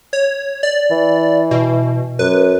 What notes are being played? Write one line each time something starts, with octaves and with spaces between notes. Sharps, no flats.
C#5
D5
E3
B2
F#2 B4